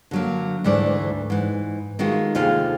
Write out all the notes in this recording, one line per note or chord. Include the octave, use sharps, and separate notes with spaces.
D3 F#3 A#3
D2 G#2 E3 A3 D5
G#2 E3
D#3 G#3 A3 F4 F#4
D#2 C3 F4 G#4 A4 F5